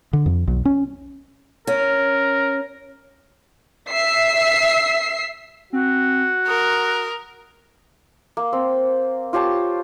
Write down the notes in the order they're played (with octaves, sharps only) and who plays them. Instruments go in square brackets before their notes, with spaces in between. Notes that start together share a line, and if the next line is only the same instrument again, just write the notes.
[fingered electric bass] D3
F2
B1
C#4
[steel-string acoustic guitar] C#4 [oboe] A#4
[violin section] E5 E6 B6 C7
[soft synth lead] C4 [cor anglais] F#4
[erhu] A#4 [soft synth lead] D#6
[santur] A#3
C4
F4 G4 C#5 A5